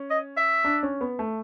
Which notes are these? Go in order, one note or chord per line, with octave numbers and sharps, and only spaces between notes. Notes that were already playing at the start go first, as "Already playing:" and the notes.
Already playing: C#4
D#5
E5
D4
C#4
B3
A3